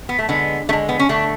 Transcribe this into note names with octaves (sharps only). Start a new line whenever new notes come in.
B3
A3
D3 G#3 B3
D3 G#3 A3
B3
C#4
D3 A3 D4